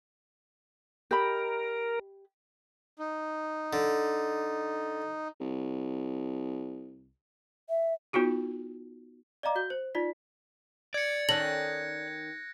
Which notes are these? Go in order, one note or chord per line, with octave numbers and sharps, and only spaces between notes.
G4 A#4 D#5 B5
D#4
D3
C2
E5
B3 D#4 F4 F#4 G#4
D5 D#5 F5 A#5 D6
F#4 G6 G7
C5
D#4 F4 D5 B6
D5 G#6 C#7
D#3 C#4 A4 F#6 A#6 F#7